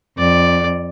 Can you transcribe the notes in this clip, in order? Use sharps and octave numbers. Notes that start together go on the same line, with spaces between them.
F2 D5